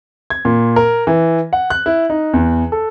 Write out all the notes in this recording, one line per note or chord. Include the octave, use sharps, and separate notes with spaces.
G#6
A#2
A#4
E3
F#5
F#6
E4
D#4
E2
A4